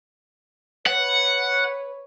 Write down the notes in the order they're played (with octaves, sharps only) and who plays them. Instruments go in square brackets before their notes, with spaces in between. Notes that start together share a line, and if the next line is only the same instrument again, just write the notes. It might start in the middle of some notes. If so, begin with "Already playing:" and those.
[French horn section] B4 C#5 [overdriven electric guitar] F#5